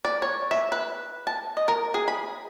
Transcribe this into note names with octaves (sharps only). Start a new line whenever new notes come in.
D5
C#5
E5
B4
A5
D#5
A#4
G#4
B5